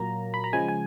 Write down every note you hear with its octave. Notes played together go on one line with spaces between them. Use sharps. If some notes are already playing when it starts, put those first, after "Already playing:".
Already playing: A#2 F#3 A#3 A#5
B5
A#5
C#3 F3 G#3 G#5
G#5